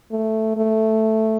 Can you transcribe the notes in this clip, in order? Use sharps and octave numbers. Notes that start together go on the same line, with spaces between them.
A3
A3